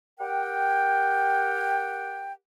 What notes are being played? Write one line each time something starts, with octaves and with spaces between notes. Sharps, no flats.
G4 A#4 F#5 G5